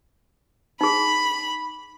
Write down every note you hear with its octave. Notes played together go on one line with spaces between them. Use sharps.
D#4 G#4 B5